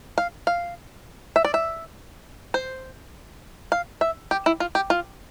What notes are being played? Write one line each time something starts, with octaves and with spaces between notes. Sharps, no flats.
F5
F5
E5
D5
E5
C5
F5
E5
G4
E4
F4
G4
F4